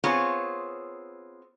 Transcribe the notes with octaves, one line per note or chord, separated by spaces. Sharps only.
B3 C4 F4 G#4 C#5